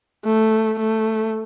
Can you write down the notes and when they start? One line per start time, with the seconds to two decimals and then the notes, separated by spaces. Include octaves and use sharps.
0.24 A3
0.79 A3